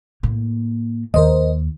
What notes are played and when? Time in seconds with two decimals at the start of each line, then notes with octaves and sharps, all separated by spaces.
0.23 A2 A#3
1.14 D#2 A#4 C5 D#5